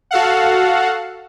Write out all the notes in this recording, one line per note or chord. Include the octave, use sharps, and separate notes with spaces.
F#4 A4 F5 F#5